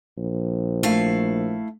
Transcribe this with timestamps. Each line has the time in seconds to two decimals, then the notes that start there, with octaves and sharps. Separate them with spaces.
0.18 A#1
0.83 A3 E4 F5